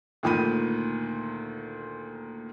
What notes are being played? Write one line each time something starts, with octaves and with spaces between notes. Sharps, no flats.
D2 A#2 D#3 B5 D#7